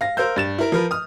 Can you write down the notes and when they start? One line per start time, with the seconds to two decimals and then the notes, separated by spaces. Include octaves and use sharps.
0.01 F5 A#6
0.17 A#4 C5 F5 E6 G6
0.36 G2 A6 E7
0.58 E4 A#4
0.72 F3 A#4 B4
0.91 D#6 F6